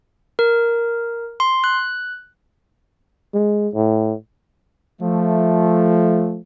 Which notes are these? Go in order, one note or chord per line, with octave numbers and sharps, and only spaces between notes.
A#4
C6
F#6
G#3
A2
F3 A3